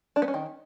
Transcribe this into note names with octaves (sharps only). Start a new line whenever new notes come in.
D4
B3
C#4
D#3